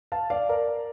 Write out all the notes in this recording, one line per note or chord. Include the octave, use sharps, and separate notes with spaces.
F5 A5
D5 F5
A#4 D5